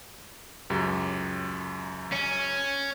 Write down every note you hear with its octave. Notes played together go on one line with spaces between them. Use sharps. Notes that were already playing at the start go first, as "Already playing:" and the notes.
C#2 F#2 G4
C#4